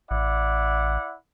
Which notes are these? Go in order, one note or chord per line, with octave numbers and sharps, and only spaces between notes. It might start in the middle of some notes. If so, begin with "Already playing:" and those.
A1 E4 D5 F#5